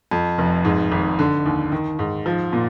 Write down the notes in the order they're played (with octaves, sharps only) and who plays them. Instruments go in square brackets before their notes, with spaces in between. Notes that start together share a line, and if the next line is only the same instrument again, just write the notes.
[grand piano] F2
F1
G#2
G#1
D3
D#2
D#3
G#2
F3
A#2